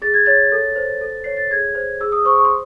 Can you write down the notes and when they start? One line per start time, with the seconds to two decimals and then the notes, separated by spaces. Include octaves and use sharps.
0.02 G#4 A6
0.14 G#6
0.26 C#5 A6
0.52 A4
0.76 C5
1.01 A4
1.24 C#5 C7
1.37 A6
1.51 G#4 G#6
1.75 C5
2.01 G#4 E6
2.12 D#6
2.25 C5 C#6
2.38 C#6
2.45 C6